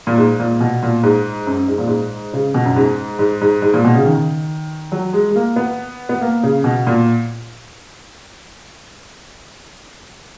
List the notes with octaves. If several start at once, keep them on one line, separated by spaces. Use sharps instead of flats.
A#2
G#2
A#2
B2
A#2
G#2
F#2
G#2
A#2
G#2
C#3
B2
F#2
G#2
G#2
G#2
G#2
A#2
B2
C#3
D#3
F#3
G#3
G#3
A#3
B3
B3
A#3
C#3
B2
A#2